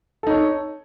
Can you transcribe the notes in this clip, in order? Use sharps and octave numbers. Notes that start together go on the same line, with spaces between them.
D#4 A4 C#5